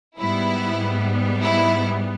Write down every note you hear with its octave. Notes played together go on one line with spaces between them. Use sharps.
G#2 G3 B3 E4
E4